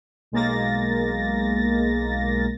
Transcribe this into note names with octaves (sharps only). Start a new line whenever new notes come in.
B1 G#3 A#3 A6 A#6